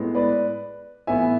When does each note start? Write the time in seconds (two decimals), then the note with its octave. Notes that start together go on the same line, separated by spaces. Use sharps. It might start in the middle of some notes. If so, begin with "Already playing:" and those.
Already playing: A2 G#3 B3
0.15 B4 D5
1.07 A2 E3 B3 E5 G#5